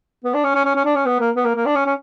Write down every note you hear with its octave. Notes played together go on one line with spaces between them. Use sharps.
B3
D4
C#4
C#4
C#4
C#4
D4
C#4
B3
A#3
B3
A#3
A#3
D4
C#4
C#4